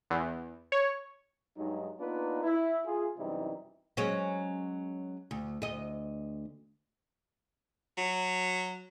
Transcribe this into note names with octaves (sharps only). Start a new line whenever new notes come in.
E2
C#5
G2 F#3 G#3 D#4
A#3 B3 D4 D#4 F4 B4
E4
F4 G#4
F#2 C3 E3 G3 D#4 E4
F#3 G#3 C#4
D2
D2 D#5
F#3